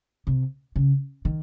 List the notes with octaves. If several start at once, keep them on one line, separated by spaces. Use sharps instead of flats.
C3
C#3
D#3